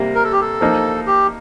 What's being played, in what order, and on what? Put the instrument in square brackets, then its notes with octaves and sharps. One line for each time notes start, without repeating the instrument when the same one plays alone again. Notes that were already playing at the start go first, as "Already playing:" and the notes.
Already playing: [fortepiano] C3 G3 A#3
[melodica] A#4
A4
G4
A4
[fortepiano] F3 A#3 D#4
[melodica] G4